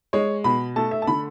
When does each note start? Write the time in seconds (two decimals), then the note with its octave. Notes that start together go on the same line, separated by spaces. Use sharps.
0.13 G#3 C#5
0.44 B2 B5
0.76 A3 A5
0.91 E5
1.02 A5
1.07 D3 B5